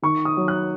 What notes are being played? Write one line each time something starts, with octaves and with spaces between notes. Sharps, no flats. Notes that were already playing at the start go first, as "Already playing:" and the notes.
D#3 C#6
D#6
F#3
F#6